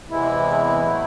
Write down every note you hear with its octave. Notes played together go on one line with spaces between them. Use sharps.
E2 C3 E3 G#3 E4
A2 F#3 A3